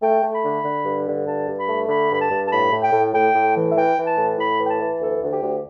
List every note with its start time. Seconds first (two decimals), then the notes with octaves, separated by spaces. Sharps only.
0.02 A3 G5
0.23 A3
0.34 B5
0.44 D3
0.64 D3
0.85 G2
1.06 D3
1.26 G2 A5
1.48 G2
1.58 B5
1.68 A3
1.89 D3 B5
2.10 G2 B5
2.20 A5
2.30 G2
2.45 A5
2.51 A2 B5
2.72 A2
2.82 G5
2.93 A2
3.13 A2 G5
3.34 A2
3.55 E3
3.71 E5
3.76 E3 G5
3.97 E3
4.07 A5
4.17 A2
4.38 A2 B5
4.59 E3
4.65 G5
4.69 A5
4.80 E3
5.00 D2 A4
5.21 D2
5.32 G4
5.42 D2